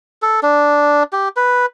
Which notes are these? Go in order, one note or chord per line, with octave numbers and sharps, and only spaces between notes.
A4
D4
G4
B4